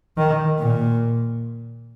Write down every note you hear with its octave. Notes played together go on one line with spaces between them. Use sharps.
D#3
A#2